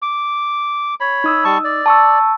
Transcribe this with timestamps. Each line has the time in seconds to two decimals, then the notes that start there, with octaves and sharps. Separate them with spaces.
0.02 D6
1.00 C#5 B5
1.24 D#4 D#6 E6
1.44 G3 A5 C#6
1.64 D5
1.86 A5 C#6 E6